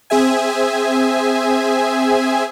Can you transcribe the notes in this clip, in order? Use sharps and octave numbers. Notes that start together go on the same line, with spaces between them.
C4 G#4 E5 G#5